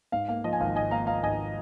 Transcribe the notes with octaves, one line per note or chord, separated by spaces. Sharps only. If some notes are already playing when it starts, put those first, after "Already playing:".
G#2 F5
A#3 F5
F3 D#5
G#5
G#1 F5
G#2 D#5 G#5
A#3 F5 A#5
F3 F5 A#5
G#1 D#5 G#5